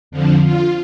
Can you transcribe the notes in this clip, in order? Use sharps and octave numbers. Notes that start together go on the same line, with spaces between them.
F2 D3 F3
F4